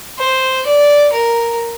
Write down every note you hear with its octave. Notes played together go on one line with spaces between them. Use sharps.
C5
D5
A#4